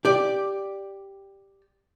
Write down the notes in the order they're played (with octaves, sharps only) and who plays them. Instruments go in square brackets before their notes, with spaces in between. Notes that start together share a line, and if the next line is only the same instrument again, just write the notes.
[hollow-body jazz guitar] G4 D5